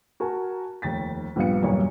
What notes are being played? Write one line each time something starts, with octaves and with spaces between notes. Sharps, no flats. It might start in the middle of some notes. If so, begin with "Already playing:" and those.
F#4 A#4 G#5 A5 C#6
F1 D#2 A6 B6
A#1 G2 B3 F5 C#7
B1 E2 G2 A#3 C#5